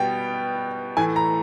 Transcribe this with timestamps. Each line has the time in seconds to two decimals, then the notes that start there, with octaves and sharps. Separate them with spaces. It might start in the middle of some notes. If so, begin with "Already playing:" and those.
Already playing: B2 G3 B3 G5
0.97 A2 E3 A3 G#5
1.16 A#5